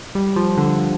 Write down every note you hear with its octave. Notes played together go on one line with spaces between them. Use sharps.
G3
F3
D3